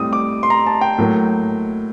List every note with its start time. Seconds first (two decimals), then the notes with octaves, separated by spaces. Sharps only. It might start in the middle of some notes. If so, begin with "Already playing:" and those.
Already playing: A2 G3 C4 D#6
0.13 D6
0.43 C6
0.50 A#5
0.66 A5
0.81 G5
0.98 A2 F#3 A#3